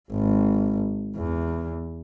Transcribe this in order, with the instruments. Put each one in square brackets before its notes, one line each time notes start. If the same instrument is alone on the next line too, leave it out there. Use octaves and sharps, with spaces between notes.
[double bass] G#1
E2